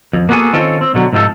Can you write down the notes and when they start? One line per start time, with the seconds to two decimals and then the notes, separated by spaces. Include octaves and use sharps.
0.13 F2
0.29 A#3 B3 F#4 G#4 A4 G#5
0.53 D#3 C4 C#4 F4 A4
0.81 C4
0.94 B2 D3 F#3
1.13 G#2 C3 F3 C4 A4